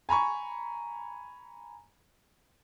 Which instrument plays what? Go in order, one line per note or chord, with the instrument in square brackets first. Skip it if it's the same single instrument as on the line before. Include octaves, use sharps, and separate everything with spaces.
[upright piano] G#5 A#5 B5 C#6